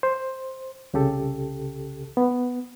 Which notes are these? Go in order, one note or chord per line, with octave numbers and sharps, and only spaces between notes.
C5
C2 C#3 G4 A4
B3